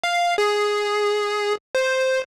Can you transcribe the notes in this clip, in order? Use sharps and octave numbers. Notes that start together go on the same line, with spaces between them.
F5
G#4
C5